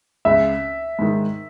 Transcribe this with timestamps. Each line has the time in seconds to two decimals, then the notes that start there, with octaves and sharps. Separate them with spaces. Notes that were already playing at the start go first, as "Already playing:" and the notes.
0.25 C#2 C#3 G#3 E5
0.99 G#2 D#3 G#3